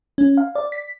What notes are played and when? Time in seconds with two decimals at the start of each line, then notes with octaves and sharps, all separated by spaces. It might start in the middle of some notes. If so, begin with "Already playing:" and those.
0.18 C#4
0.37 F5
0.55 D5
0.72 B6